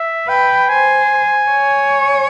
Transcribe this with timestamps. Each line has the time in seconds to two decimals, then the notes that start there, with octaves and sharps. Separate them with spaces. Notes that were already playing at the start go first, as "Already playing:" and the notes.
Already playing: E5
0.28 B4 G5
0.69 C5 G#5
1.51 C#5